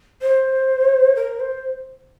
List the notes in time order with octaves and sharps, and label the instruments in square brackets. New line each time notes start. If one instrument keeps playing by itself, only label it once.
[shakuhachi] C5
A#4
C5